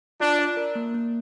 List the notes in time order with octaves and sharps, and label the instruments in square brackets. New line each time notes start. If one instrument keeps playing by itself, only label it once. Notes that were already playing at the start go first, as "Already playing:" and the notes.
[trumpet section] D4 [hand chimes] F4
[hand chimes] D5
A#4
A#3
A#3